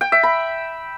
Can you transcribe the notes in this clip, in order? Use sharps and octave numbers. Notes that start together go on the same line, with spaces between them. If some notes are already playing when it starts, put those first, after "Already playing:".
G5
E5
B5